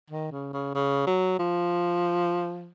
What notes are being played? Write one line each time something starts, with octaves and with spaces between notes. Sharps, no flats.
D#3
C#3
C#3
C#3
F#3
F3